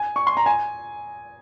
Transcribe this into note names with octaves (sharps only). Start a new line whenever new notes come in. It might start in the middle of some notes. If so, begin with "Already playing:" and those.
Already playing: G#5
C#6
C6
A#5
G#5